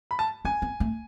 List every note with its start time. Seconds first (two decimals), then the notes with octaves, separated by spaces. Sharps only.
0.11 B5
0.19 A5
0.45 C#4 G#5
0.62 B3
0.80 A3